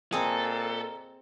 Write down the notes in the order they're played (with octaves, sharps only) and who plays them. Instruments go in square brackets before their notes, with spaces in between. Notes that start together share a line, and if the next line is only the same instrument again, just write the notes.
[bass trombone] A#2 [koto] C4 G#4 [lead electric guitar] A4 [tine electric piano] D#5 A#5